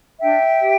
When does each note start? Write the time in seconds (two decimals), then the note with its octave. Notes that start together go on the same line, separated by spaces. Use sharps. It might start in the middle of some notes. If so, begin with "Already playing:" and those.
0.21 D4 E5 G5
0.60 G4